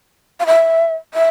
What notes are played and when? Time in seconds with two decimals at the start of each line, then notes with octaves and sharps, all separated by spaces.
0.40 F5
0.46 E5
1.14 E5